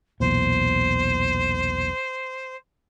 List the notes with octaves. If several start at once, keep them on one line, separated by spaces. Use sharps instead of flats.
B1 E2 A#2 C5